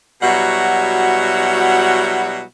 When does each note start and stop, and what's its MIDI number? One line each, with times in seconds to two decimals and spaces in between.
0.22 2.41 47
0.22 2.41 54
0.22 2.41 55
0.22 2.41 64
0.22 2.41 66
0.22 2.41 78